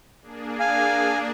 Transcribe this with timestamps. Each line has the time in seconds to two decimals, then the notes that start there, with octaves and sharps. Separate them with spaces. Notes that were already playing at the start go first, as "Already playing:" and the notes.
0.22 A#3 D4 G#4
0.60 F5 G#5